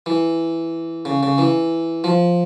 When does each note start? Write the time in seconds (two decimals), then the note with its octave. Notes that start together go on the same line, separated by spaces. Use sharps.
0.06 E3
1.05 C#3
1.23 C#3
1.38 E3
2.04 F3